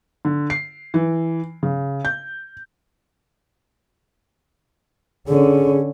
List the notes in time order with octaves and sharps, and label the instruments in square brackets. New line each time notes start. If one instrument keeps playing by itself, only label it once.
[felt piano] D3
C7
E3
C#3
G6
[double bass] D3 C#4 [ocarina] G#4